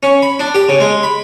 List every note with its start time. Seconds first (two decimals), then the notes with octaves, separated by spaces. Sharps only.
0.03 C#4
0.22 B5
0.39 D4
0.55 G4
0.69 C#3
0.80 G#3
1.03 B5